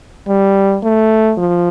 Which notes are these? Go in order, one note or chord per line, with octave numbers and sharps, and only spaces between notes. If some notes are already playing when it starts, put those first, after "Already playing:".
G3
A3
F3